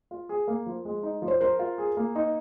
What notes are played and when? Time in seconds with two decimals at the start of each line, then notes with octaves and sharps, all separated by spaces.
0.11 F4
0.29 G#4
0.48 A#3
0.66 F3
0.85 G#3
1.03 D#4
1.22 F3
1.28 C5
1.40 A#4 C5
1.59 F4
1.78 G#4
1.97 A#3
2.15 D#4